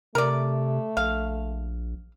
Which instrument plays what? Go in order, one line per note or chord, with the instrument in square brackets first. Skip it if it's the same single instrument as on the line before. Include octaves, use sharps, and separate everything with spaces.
[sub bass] C3 [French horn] A3 [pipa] A#4 D5
[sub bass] A#1 [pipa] F5